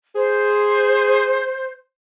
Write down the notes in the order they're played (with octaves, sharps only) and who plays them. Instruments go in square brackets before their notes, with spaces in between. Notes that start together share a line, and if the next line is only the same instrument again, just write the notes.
[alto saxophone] G#4 [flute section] C5